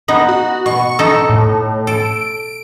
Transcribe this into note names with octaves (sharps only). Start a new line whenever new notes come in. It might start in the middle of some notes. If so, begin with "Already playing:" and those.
B3 D#4
F#4
B2 C#6
D#4 A4
A2
A4 D7